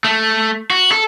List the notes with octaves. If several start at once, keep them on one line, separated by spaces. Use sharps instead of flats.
A3
F#4
A4